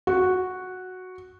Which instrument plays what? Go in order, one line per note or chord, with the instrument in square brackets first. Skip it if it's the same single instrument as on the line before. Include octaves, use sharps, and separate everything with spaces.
[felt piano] F#4